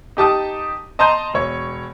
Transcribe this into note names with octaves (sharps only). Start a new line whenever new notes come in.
D#4 G4 A5 D#6
D#5 A5 A#5 C6 G6 D#7
E1 C#5 C#6